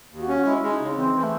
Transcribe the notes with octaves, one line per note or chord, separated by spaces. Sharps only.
D#2
F#4
C#4
F#4
G#3 E4
G#3
D#4
C#3
C#4
E3 C4
E3
A3